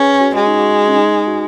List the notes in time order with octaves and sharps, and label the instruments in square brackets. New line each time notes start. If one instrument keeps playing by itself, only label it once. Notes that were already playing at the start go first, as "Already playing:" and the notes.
Already playing: [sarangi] C#4 [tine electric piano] G#4 B4
[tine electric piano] F#4
[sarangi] G#3 [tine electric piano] F#4
[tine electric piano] D#4
F#4
C#4
D#4
F#4